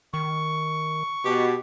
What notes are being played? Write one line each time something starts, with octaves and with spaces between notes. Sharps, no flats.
D#3 C#6
B2 G4